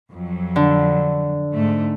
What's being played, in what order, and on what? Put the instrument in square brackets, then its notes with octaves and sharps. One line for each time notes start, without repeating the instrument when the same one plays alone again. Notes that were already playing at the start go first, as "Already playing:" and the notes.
[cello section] F2 F#3
[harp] D3
[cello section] G#2 A3